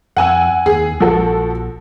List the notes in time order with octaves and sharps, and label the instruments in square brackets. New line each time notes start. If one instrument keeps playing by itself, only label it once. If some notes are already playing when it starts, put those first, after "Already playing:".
[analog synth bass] F2 [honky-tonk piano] F#5 G#5 E6
[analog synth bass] D#2 [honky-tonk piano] G#4
[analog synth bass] A#1 [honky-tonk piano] F3 F#4 A4